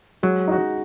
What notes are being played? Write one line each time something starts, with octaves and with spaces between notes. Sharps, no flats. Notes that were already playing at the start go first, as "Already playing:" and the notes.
F#3 G#3
D#4 F#4